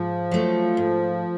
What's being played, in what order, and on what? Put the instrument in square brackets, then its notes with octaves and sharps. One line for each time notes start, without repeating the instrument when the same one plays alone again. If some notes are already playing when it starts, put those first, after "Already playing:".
Already playing: [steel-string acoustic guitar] G#2 [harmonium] F3
[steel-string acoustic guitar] F#3 A3
G#2